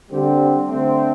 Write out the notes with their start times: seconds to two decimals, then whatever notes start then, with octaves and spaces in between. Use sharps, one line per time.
0.10 D3 G3 C4 G4
0.68 D3 A3 C4